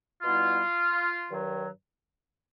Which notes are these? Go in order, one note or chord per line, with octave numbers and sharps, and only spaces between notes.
B2 G3 B3 E4 F4
G2 D#3 F#3